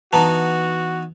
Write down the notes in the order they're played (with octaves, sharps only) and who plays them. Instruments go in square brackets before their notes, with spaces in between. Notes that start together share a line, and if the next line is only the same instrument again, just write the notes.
[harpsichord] E3 B3 D#4 [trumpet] F#4 [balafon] A5 A#5